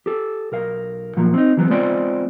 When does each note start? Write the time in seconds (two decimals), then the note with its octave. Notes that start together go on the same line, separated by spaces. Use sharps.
0.06 G4 A4
0.52 B1 A#4 F5
1.16 A#2 F3 F#3 A#3
1.34 C4 D#4
1.57 E3 F#3 B3 C4
1.70 G#3 B3 C4 F4 C5 D5